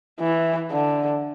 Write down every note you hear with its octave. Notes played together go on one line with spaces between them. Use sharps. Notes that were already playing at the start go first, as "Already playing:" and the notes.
E3
D3